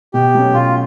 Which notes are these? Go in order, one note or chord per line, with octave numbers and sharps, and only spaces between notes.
B2 G4
F#3 A3 C#4
B2 F4